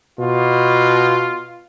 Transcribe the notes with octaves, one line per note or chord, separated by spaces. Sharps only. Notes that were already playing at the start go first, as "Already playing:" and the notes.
B2 F4